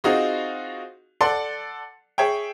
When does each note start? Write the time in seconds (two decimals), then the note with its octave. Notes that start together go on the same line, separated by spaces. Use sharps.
0.04 C4 D#4 F4 F#4 G#4
1.21 A4 D5 F#5 C6
2.18 G#4 C#5 E5 G5